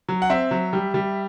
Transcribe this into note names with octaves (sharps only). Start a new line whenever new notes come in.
F#3
F#5
C4 E5
F#3
G3
G3